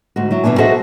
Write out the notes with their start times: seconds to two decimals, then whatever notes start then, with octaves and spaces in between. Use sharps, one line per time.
0.16 D2 G#2 F#4
0.31 F#3 E4
0.44 G2 B2 E3 D4 G#5
0.58 F#4 G#4 A4 C5 D#5 E5